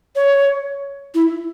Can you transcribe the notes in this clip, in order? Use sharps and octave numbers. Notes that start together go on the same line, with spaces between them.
C#5
E4